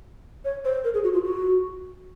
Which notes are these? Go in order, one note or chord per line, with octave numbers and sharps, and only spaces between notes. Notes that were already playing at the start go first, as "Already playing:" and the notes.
C#5
C5
A#4
G#4
F#4
F4
F#4